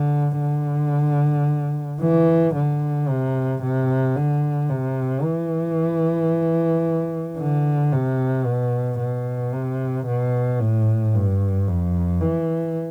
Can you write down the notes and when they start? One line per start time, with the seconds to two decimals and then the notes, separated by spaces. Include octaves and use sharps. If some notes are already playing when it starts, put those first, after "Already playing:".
Already playing: D3
0.40 D3
2.01 E3
2.55 D3
3.09 C3
3.63 C3
4.16 D3
4.70 C3
5.24 E3
7.38 D3
7.92 C3
8.46 B2
8.99 B2
9.53 C3
10.07 B2
10.60 A2
11.14 G2
11.68 F2
12.22 E3